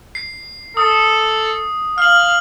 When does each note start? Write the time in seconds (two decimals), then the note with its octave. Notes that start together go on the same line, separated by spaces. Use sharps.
0.15 C7
0.77 A4 D#6
1.98 F5 F6 F#7